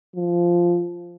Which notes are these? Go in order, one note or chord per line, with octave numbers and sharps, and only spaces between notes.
F3